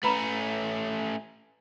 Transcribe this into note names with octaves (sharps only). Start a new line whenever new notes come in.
A3 C#4 B4 A#5 B5